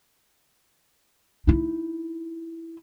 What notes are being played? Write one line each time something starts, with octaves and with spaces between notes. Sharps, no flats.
D#4 E4